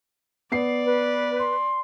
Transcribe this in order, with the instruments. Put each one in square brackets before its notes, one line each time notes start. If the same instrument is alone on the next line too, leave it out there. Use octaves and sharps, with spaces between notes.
[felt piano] B3 C7 [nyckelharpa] D5
[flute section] B4
[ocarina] C6